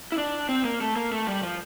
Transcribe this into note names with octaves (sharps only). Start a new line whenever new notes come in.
E4
D4
C4
A#3
A3
A#3
A3
G3
F3